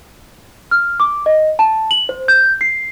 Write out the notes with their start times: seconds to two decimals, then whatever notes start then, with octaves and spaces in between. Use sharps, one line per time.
0.71 F6
1.00 D6
1.26 D#5
1.59 A5
1.91 F#7
2.09 C5
2.28 G6
2.61 C7